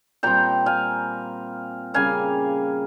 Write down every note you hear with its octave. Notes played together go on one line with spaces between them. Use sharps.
A#2 G3 C4 G5 A#5
F5 G#5
C#3 G3 A#3 F5 G#5